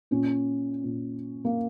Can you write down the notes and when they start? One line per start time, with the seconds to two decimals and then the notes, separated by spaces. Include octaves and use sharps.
0.11 A#2 C#4
0.84 A#2
1.45 A#3